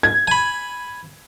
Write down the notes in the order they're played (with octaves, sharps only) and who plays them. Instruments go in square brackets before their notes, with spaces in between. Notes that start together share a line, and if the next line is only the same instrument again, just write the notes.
[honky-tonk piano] G#6
[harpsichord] G#5 B5